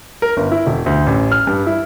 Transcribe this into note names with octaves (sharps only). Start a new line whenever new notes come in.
A#4
G1
E4
E1
D2
A1
F6
G2
E4